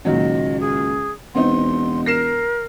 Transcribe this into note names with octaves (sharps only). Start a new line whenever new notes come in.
C#2 A#2 D#3 F#3 D#5
G#4
E1 B3 C4 D#4 C6
A#4 A#6 C7 E7